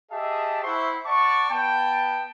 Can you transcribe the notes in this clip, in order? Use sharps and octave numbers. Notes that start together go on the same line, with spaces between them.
G4 G#4 D#5 E5 A5
E4 C5 E5 F#5 C6 C#6
D5 F#5 A5 C#6
B3 G5 A5